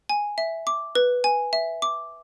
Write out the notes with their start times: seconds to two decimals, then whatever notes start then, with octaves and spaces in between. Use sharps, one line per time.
0.09 G#5
0.38 E5
0.67 D6
0.95 B4
1.24 G#5
1.53 E5
1.82 D6